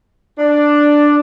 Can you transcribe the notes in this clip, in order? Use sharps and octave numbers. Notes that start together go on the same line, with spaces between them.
D4